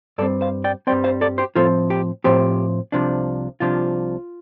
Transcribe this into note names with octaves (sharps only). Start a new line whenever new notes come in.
G2 G3 C4 A4 D5
C5 F5
D5 G5
G2 G3 C4 D5 G5
C5 F5
A4 D5
G4 C5
A2 F3 C4 F4 A4
G4
A2 F3 C4 G4
C2 C3 F3 D4
C2 C3 F3 D4 F4